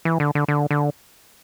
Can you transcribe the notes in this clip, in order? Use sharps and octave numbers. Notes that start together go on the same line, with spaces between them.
E3
D3
D3
D3
D3